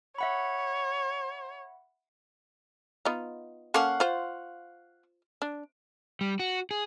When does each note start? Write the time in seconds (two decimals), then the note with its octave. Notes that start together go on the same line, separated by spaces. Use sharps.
0.18 C#5 E5 F#5 B5
3.05 B3 D#4 F4
3.74 A#3 C#4 A4 F5 F#5 C#6
4.00 F4 C5
5.42 D4
6.21 G3
6.40 F#4
6.71 G#4